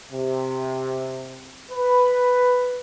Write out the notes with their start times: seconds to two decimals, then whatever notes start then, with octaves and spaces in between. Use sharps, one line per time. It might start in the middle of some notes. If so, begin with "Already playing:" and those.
0.12 C3
1.71 B4